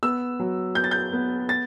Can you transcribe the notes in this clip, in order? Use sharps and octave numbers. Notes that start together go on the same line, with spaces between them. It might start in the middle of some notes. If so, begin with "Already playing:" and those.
B3 E6
F#3
B3 G6
A6
G6
B3
A6